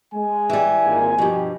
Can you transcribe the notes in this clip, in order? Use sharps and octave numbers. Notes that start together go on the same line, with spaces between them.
G#3 G#5
E3 G3
G#1 A#2
G2 B2 F3 G4